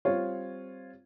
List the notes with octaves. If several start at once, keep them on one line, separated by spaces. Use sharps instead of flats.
G3 C4 F4 C#5